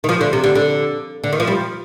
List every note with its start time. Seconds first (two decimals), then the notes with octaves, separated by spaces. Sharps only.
0.04 D#3
0.09 F3
0.21 D3
0.33 C3
0.44 D3
0.55 D3
1.24 D3
1.33 D#3
1.40 F3
1.48 G3